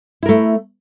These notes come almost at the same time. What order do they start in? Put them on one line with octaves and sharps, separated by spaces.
E4 A#4 A3